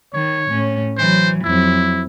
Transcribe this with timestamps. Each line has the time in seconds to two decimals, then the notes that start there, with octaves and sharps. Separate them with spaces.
0.14 D#3 C#5
0.51 A2 C#4
0.98 E3 F#3 C5
1.45 F2 F#3 E4